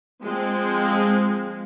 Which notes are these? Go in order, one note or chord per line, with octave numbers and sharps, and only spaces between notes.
F3 G#3 C4